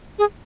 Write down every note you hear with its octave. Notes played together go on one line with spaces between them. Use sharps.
G#4